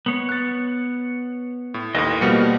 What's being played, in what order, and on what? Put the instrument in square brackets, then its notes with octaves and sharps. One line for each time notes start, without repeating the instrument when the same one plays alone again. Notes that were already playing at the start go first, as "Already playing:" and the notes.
[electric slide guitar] B3 C#5
[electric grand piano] F#6 A6
A2
[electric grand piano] D#2 A2 [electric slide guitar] B4 D#5
[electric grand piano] B2 F3 G3 [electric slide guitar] A#3 A#4 F#5